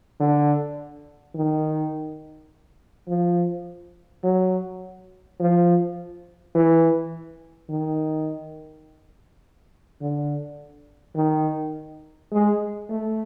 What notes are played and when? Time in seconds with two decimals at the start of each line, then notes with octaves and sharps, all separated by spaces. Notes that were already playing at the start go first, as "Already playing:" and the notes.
0.20 D3
1.36 D#3
3.09 F3
4.23 F#3
5.40 F3
6.55 E3
7.70 D#3
10.01 D3
11.16 D#3
12.32 G#3
12.90 A3